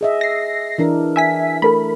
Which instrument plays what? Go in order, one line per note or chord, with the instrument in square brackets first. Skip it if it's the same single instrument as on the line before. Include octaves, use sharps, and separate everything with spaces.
[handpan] G#4 D#5 E5
[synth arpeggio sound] A#6 C7
[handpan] E3 D4 A#4
[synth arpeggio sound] E5 G#5 B6
[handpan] A3 [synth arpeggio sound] A4 A#4 B5